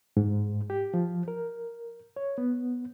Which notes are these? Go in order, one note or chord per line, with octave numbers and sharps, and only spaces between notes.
G#2
G4
F3
A#4
C#5
B3